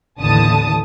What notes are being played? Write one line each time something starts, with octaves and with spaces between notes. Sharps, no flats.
A1 D#2 D3 E3 A5 D#6